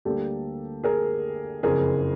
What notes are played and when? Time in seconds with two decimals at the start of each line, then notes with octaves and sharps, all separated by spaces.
0.05 D2 D3 G3 A#3 G4 A4
0.84 G#4 A#4
1.63 F#1 F2 C#3 G#4 A#4